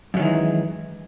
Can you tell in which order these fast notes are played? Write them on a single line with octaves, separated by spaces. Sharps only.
F#2 F#3 D#3 E3 G#3